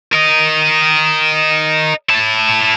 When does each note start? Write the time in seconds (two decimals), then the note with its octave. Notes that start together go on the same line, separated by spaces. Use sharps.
0.12 A#4 D#5
2.09 E4 A5